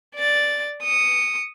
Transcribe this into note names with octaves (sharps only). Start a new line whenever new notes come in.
D5 A6
D#6 C#7